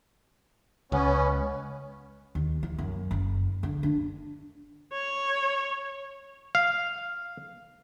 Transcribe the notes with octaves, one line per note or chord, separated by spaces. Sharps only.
C#2 B3 C#4
D#2
E3
F#2
F#1
D3
D4
C#5
F5